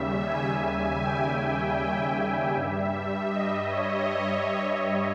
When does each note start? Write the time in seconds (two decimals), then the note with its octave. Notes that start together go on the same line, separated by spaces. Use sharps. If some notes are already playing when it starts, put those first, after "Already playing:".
Already playing: D#2 C#3 G3 E5
0.26 G#5
1.03 G5
2.55 G2 G3 E5
3.31 D#5
3.69 C#5